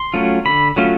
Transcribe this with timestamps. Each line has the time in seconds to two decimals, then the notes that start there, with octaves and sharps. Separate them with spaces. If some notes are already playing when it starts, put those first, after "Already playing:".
Already playing: C6
0.14 F#3 A3 C#4 F4
0.45 D3 B5
0.76 F#3 A3 C#4 F4